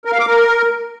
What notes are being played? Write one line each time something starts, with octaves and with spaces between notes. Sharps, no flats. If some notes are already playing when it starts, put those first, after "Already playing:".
A#4
F5
D6
A#4